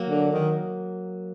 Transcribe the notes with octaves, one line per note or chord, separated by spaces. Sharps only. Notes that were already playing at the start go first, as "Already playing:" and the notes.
Already playing: F#3 A#3
D3
D#3